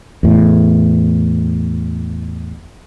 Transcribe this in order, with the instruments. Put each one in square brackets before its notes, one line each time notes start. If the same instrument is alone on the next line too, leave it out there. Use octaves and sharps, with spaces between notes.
[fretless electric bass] E2 A2